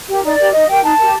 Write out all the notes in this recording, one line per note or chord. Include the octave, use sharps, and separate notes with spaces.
G4 A#4
D#4 D5
G4 A#4
D#4 D#5
G4 A#4 G5
D#4 A5
G4 A#4